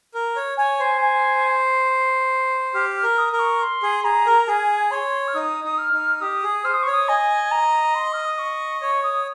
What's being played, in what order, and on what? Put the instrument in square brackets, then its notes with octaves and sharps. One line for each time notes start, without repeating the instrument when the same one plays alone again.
[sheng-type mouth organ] A#4
C#5
[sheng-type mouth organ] C#5 [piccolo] G#5
[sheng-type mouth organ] C5
[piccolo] G#5
[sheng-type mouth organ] G4 [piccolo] F6
[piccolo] F6
[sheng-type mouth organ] A#4
[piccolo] D#6
[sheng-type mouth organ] A#4
[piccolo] C#6
C6
[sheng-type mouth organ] G#4
[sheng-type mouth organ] G#4 [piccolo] A#5
[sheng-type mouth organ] A#4
[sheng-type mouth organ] G#4 [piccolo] G#5
[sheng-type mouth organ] C#5 [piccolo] C6
[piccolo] F6
[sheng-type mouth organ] D#4 [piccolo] D#6
[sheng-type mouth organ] D#4
[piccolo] F6
[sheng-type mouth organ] D#4
[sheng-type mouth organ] G4 [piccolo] D#6
[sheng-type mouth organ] G#4
[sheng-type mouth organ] C5 [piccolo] F6
[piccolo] D#6
[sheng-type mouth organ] C#5 [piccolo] C#6
[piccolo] D#6
[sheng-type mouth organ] D#5 [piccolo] G#5
[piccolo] A#5
C6
F6
D#6
C#6
[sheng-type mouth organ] C#5 [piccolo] C#6
[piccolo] D#6